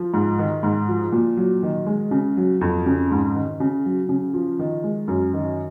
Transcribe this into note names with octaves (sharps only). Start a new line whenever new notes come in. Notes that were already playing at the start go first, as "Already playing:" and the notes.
Already playing: F3
G#2
D#3
G#2
F3
A#2
F#3
D#3
G#3
C#3
F#3
F2
C#3
G#2
D#3
C#3
F#3
C#3
F3
D#3
G#3
F#2
D#3